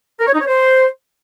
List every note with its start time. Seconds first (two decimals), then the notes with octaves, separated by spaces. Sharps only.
0.19 A#4
0.26 C#5
0.33 D#4
0.40 C#5
0.47 C5